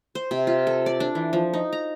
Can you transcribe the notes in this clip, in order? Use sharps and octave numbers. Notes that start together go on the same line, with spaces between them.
C5
C3
F4
A4
D5
D4
E3
F3
D#4
A#5